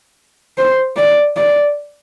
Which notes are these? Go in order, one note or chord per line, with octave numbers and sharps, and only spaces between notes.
C5
D5
D5